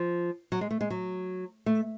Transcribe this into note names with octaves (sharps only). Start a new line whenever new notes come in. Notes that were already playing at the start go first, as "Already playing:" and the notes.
Already playing: F3
F#3
G#3
A3
G#3
F#3
A3